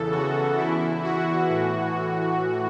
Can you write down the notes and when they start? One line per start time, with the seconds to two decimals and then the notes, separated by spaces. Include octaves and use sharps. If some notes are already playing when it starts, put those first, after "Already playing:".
Already playing: E2 C#3 E3 A4
0.12 F#4
0.58 E2 E3 E4
1.04 F#4
1.50 A2 E3